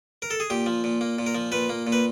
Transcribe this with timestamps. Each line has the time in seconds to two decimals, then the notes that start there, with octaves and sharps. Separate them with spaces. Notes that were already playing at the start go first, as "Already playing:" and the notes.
0.22 A#4
0.31 A4
0.40 G#4
0.50 A#2 G4
0.66 F3
0.84 A#2
1.01 A#3
1.19 A#2
1.26 A#4
1.35 F3
1.52 A#2 B4
1.70 A#3
1.87 A#2
1.92 B4